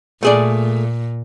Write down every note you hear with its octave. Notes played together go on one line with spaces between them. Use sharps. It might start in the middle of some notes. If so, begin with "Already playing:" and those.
A#2 A3 G#4 D5